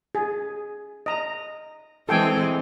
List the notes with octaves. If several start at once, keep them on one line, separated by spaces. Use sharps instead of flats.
G#4
D#5 A#5
E3 G#3 C4 A4 G5 G#5